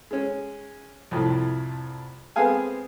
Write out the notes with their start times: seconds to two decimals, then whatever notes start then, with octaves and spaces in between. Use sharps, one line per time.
0.11 G#3 C#4
1.11 C2 F2 A2
2.36 G#3 B3 C4 G#4 F5 G#5